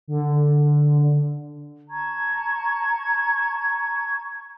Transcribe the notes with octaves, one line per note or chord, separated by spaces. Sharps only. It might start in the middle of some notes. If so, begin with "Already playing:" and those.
D3
A5 A#5 C#6 G#6